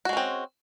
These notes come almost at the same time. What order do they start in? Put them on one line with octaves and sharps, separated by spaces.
F#4 G#3 C#4 C4